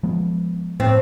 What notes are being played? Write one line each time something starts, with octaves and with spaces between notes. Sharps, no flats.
F3 G#3 B3
A2 C4